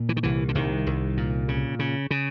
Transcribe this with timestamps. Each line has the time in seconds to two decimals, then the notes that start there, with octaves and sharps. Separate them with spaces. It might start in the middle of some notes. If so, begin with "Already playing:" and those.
Already playing: A#2
0.09 E3
0.17 D#3
0.23 C2 E3
0.49 D3
0.55 C2 D#3
0.86 C2
1.17 A#2
1.48 C#3
1.79 C#3
2.11 C#3